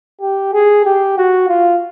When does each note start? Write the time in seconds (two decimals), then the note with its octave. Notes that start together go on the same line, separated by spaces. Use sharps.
0.21 G4
0.53 G#4
0.85 G4
1.18 F#4
1.49 F4